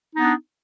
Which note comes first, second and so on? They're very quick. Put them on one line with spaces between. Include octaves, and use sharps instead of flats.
D#4 B3 D4